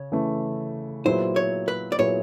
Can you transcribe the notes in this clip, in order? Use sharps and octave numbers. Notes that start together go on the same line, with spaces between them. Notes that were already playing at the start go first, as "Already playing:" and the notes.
Already playing: C#3 C#5
C#3 E3 A3
A#2 F#3 B3 E4 G#4 C5
C#5
B4
D5
A#2 F#3 B3 E4 G#4 C#5